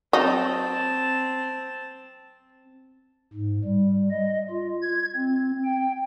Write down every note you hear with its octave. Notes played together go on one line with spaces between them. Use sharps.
F#3 C4 D#4 A5
G#2
G3
D#5
F4
G#6
C4
G5